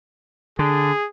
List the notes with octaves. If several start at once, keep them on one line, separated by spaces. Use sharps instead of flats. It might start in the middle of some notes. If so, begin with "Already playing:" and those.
D3 G#4